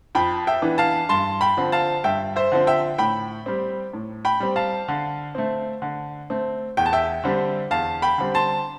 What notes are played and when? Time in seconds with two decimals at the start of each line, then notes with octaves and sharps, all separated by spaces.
0.15 F2 G5 B5
0.47 E5 G5
0.62 E3 B3 D4
0.78 F5 A5
1.09 G2 A5 C6
1.41 G5 B5
1.57 D3 F3 C4
1.72 F5 A5
2.04 G2 E5 G5
2.36 C5 E5
2.52 D3 F3 C4
2.67 E5 G5
2.98 A2 G5 B5
3.46 G3 C4
3.94 A2
4.25 G5 B5
4.40 G3 C4
4.56 F5 A5
4.88 D3
5.35 A3 C4
5.82 D3
6.30 A3 C4
6.77 E2 G5
6.86 A5
6.93 E5 G5
7.24 D3 G3 C4
7.71 E2 F5 A5
8.02 G5 B5
8.18 D3 G3 C4
8.34 A5 C6